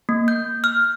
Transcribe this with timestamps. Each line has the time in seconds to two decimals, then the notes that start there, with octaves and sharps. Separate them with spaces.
0.09 A#3
0.28 G6
0.64 F6